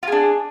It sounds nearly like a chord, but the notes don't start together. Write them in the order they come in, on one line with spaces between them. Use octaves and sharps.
F4 G#4 D4